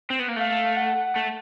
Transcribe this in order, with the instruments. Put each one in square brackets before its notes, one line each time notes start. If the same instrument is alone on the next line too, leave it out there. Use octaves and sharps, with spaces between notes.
[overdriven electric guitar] C4
B3
A#3
[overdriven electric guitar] A3 [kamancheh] F5
[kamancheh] F#5
[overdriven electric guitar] A3